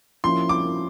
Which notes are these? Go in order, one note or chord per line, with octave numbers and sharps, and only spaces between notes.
F3 A#3 C#4 E4 C6
D6